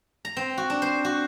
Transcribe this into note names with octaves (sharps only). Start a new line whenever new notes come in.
A#5
C4
F#4
D4
C5
F#4